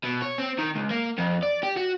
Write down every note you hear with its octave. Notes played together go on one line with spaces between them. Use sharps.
B2
C#5
C4
D#3
C#2
A#3
F2
D5
G4
F#4